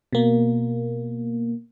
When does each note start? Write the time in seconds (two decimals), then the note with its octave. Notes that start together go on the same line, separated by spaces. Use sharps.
0.13 B2 A#3